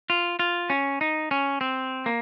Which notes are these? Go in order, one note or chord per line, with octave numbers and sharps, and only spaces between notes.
F4
F4
C#4
D#4
C#4
C4
A#3